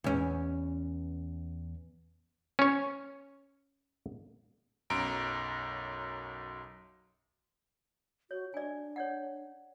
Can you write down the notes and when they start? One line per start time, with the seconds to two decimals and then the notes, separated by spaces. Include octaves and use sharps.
0.04 E2 C#4
2.59 C#4 C#5
4.90 B1 F#2 A#5 D7
8.31 F#4 C#5
8.54 D4 D5 G#5
8.96 C#5 D5 F#5